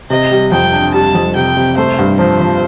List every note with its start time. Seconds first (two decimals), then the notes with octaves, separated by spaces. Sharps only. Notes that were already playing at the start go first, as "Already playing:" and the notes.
0.10 C3 D#5
0.31 G3
0.52 F2 G5
0.73 D4
0.94 G3 A5
1.15 F2
1.36 C3 G5
1.57 C3
1.78 A3 C5
1.99 G2
2.19 F3 C5
2.40 F3